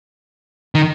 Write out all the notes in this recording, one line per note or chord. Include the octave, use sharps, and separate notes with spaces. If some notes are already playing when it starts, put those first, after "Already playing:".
D#3